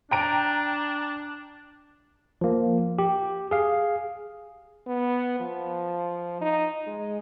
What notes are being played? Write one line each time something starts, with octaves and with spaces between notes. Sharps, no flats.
D4 G5 A#5 D7
F3 A#3
G4
G#4 F5
B3
F3
D#4
G#3